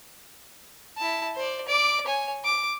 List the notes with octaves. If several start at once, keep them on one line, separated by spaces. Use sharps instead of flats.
E4 A5
C5 D5
D5 D6
C#5 G#5
D6